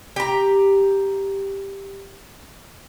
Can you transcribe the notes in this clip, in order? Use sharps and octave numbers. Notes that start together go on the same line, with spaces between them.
G4 A#5